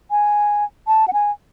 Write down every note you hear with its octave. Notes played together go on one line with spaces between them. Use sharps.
G#5
A5
F#5
G#5